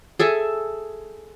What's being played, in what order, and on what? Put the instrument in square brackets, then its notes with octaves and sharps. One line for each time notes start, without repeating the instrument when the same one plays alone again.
[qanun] G#4 A4 E5 G#5